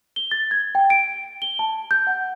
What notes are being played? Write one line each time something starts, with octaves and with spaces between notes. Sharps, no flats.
G7
A6
G#6
G5
D7
G7
A5
G6
F#5